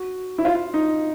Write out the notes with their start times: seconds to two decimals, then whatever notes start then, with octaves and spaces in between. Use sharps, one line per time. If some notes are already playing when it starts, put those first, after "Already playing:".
Already playing: F#4
0.38 E4
0.45 F4
0.55 F4
0.74 D#4